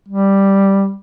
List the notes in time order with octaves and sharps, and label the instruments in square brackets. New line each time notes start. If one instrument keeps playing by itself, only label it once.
[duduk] G3